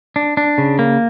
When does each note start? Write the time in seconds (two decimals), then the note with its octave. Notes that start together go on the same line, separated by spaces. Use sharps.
0.16 D4
0.37 D4
0.58 C#3
0.79 A#3